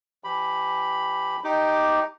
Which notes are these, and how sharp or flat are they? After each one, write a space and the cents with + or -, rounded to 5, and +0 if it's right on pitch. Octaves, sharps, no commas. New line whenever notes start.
E3 +45 G4 +0 B5 +0
D#4 +0 G4 +0 D6 +0